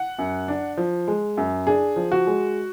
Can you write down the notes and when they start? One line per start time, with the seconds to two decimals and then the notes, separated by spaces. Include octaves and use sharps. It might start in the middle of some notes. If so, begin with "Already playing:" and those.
Already playing: F#5
0.18 F#2
0.48 D4
0.77 F3
1.08 G#3
1.37 F#2
1.67 D4 G#4
1.96 F3
2.12 F#4
2.27 G#3